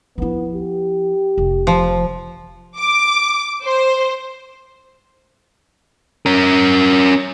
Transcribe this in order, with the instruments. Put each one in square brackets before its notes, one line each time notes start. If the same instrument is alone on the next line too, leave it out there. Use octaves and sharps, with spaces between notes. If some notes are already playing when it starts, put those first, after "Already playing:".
[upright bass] F3 E4 [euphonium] B3
[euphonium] G4
[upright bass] F1
[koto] F3
[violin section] D6
C5
[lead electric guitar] C#4 A#4